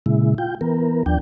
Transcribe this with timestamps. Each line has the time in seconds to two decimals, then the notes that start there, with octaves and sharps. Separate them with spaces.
0.06 A#2 C#3 G#3 E4
0.38 F4 G5
0.61 E3 B3 A#4
1.06 D#2 F3 D4 G5